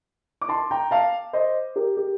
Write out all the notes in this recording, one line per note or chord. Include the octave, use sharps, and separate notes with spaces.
D6
A5 C6
G5 A#5
F5 A5
C5 D#5
G4 A#4
G4